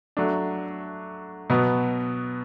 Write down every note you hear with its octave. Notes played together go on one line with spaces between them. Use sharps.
F#3 A3 D4
B2 F#3 B3